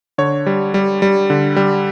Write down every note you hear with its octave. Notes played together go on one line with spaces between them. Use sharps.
D3 C#5
G3
G3
G3
D3
G3